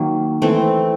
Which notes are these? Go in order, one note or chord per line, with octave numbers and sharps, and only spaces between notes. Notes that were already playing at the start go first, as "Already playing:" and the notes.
Already playing: D#3 F#3 A#3
E3 A3 C4